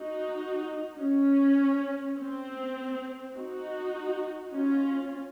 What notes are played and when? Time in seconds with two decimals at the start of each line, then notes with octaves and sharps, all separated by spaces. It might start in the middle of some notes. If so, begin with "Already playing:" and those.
Already playing: D#4 F#4
0.99 C#4
2.18 C4
3.35 D#4 F#4
4.53 C#4 F4